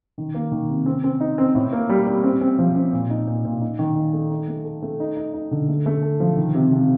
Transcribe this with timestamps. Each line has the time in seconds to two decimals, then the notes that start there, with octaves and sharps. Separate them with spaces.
0.18 D#3
0.34 A#3
0.52 D#3
0.69 C3
0.86 C4
1.04 C4
1.20 D#4
1.38 C4
1.55 A2
1.73 A#3
1.89 G3
2.07 G3
2.24 C4
2.41 C4
2.59 F3
2.76 C4
2.93 A#2
3.10 D#4
3.27 A#2
3.45 A#2
3.61 D#4
3.79 D#3
3.96 D#4
4.13 A3
4.30 D#4
4.48 A3
4.64 A4
4.82 A3
5.00 D#4
5.17 D#4
5.34 D#4
5.51 D3
5.69 A3
5.86 A3
6.02 A4
6.20 F3
6.37 D#3
6.55 C3
6.72 C3